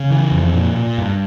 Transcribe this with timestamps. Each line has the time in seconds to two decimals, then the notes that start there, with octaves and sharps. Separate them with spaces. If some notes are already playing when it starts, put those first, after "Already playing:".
Already playing: C#3
0.10 E3
0.32 F2
0.54 A#2
0.76 A#2
0.98 G2